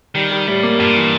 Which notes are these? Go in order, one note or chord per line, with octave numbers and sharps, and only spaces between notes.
D#3 G3
G3
A2 G3
A#3
G2 A#2
E3